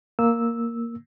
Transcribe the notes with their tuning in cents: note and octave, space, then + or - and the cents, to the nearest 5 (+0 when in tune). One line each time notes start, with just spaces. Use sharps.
A#3 +0 E6 -10